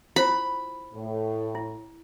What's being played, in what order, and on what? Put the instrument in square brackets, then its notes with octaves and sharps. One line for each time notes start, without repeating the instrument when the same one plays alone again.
[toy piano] E4 F4 C5 [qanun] B5
[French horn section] A2
[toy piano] E4